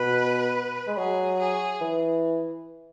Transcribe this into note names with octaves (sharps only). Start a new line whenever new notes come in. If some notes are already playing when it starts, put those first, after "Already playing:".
Already playing: B2 B4
G#3
F#3 G#4
G#4
E3